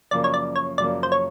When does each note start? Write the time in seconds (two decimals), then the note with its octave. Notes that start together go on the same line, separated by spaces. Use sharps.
0.11 F#2 C#3 F3 A#3 D5
0.24 C#5
0.34 D5
0.56 C#5
0.78 F#2 C#3 F3 A#3 D5
1.03 C5
1.12 C#5